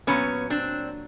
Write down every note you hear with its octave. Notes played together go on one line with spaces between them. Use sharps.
A#2 F#3 B3 C#4
C4 D4